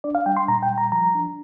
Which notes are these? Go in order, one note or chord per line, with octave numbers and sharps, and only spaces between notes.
D4 D5
F5
G3 G5
C6
A#2 A#5
G5
G3
A#5
F3 A#5
D4